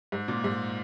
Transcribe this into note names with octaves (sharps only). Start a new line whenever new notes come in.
G#2
A#2
G#2